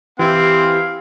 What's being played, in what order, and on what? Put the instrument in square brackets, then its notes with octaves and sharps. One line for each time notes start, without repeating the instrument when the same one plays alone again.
[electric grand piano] E3 E4 [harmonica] C4 [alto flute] G4 [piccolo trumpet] F5